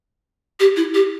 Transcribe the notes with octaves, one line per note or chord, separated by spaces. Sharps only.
G4
E4
G4